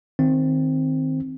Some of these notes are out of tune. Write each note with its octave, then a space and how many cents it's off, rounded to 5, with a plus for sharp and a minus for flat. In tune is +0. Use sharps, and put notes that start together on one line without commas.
D#3 +0 C4 +0